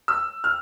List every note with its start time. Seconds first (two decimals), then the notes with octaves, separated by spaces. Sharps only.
0.08 E6
0.44 F6